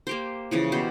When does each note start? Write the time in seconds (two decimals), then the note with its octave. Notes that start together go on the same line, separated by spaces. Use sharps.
0.07 A#3 G4 C5
0.51 C#3 E3 F3
0.72 B2 G4 C5